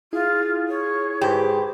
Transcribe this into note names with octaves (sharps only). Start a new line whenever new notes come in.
E4 F4 G#4
C#5
G#2 G4 B4 C5 B5